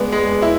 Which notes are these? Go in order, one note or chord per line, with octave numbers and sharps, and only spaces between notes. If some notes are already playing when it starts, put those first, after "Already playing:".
Already playing: G#3 B3 D4
G#3
E4